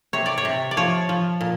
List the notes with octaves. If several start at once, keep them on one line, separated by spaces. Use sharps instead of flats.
C3 C#5
D5
C#5
C3
D5
F3 C#5
F3
A#2